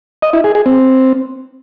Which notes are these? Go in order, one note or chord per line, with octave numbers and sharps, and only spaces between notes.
D#5
E4
G#4
G#4
C4